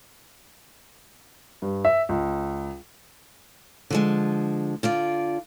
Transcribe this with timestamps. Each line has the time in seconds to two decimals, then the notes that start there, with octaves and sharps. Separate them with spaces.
1.62 G2
1.85 E5
2.09 C#2
3.90 D3 F3 G#3
4.83 D3 F4 D5